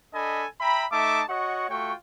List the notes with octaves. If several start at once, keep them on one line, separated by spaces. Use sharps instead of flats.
D4 A4 D#5 G#5 B5
E5 G5 A#5 B5
A3 D#4 E5 A5 D6
F#4 C#5 D#5 F#5 C#6
A3 F4 F#4 G5 C#6